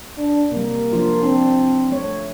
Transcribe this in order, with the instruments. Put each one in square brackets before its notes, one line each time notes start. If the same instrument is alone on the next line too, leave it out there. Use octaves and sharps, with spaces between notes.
[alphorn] D4
[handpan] C3 G3 [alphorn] A#3
[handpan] F3 D4 F4
[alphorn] C4 [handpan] D4
[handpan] A3 C#5